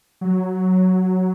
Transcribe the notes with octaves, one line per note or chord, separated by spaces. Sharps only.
F#3